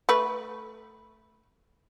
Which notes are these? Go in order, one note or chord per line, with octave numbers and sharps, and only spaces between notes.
A3 B4